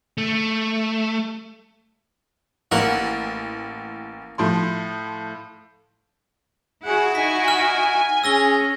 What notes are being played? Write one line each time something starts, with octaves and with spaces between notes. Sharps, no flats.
A3
A1 A#3 A#4 F#5
A2 F3 C6
E4 F#4 G#4 F#5
D#4 G#5 B6
F6
C#4 G#4 E6 A#6 G7